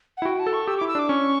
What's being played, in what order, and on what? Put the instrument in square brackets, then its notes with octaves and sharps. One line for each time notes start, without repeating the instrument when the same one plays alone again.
[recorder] F#5
[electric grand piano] E4
[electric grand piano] F#4 [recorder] G5
[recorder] A5
[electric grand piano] A4
[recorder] C#6
[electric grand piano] G4 [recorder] E6
[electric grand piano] E4 [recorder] D6
[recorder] E6
[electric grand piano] D4 [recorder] D6
[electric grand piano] C#4 [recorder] C#6